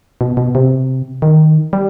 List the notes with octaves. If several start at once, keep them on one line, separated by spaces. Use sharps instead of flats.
B2
B2
C3
D#3
G3